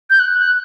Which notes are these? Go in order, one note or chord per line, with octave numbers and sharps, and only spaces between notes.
G6
F#6
F#6